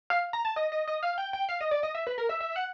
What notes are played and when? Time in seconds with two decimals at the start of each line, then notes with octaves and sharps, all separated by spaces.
0.10 F5
0.33 A#5
0.45 A5
0.56 D#5
0.72 D#5
0.88 D#5
1.03 F5
1.18 G5
1.33 G5
1.49 F5
1.61 D#5
1.71 D5
1.83 D#5
1.95 E5
2.07 B4
2.18 A#4
2.29 E5
2.40 E5
2.56 F#5